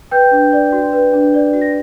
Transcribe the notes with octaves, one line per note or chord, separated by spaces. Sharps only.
B4 G5 G6
D4
D5
F#4
B4
D4
D5
F#4
A#6